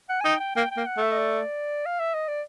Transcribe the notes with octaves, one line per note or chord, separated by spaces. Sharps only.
F#5
G#5
D#4 G5
G5
A#3 G5
G5
A#3
F#5
A3
E5
D#5
D5
F5
E5
D#5
D5